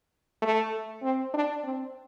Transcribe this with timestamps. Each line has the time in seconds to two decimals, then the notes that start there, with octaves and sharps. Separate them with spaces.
0.42 A3
1.03 C4
1.34 D4
1.64 C4